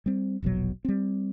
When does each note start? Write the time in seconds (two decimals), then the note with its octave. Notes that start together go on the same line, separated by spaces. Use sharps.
0.06 G3 C4
0.43 E1 A#1 B2 F#3
0.85 G3 C4